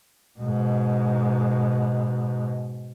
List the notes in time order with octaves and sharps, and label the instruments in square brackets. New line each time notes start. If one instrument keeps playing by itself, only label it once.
[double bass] G#2 B2